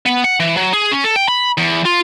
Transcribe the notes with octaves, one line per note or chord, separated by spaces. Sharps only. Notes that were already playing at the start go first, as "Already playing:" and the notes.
B3
F#5
E3
F#3
G#4
C#4
A4
G5
B5
E2
F4